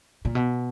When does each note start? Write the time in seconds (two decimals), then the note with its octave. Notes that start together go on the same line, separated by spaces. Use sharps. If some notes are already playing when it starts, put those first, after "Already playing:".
0.25 A#2
0.35 B2